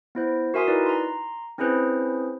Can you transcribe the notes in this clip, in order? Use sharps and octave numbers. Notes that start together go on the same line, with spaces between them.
B3 E4 C5
F#4 A#4 E5 G#5 C6 D#6
D#4 E4 B4 D5
A#5 C6
C4 C#4 E4 G#4 B4 C5